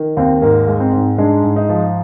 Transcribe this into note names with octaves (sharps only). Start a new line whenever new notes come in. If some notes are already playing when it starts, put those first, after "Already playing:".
Already playing: D#3
D#2 C4
G#2 A#3
G#3
C4
G#2
G#3 D4
G#2
D#4
F3